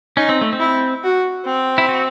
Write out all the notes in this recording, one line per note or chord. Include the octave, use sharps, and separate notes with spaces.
C#4 D#4
C4
A3
C4
E4
F#4
C4
E4
F#4